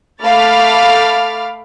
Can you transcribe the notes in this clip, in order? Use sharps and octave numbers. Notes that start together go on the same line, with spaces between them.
A3 F5 B5 D6 F6 A6